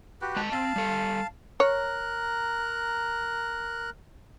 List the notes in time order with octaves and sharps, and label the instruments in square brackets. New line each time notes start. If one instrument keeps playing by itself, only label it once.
[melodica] F#4 G4 B4
[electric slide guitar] G#3 D#5 A5
[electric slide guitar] C4 [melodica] F5 A5
[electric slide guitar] G3 A4
[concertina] A#4 A#5 F#6 [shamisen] C#5